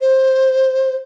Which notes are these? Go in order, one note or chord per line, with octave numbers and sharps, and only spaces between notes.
C5